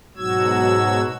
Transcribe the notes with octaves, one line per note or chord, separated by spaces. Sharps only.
G#2 B2 F#3 F#4 E6 G#6